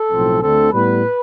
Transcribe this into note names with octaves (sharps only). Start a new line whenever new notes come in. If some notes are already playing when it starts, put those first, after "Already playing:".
Already playing: A4
B1 A2 F3 C4
D2 D3 A3 C4 A4
A2 G3 B3 B4